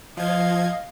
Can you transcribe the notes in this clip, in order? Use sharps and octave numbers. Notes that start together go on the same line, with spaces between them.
F3 D#5 F5 G#6